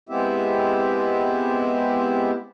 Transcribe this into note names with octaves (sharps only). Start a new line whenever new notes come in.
G#3 B3 C4 E4 G4 E5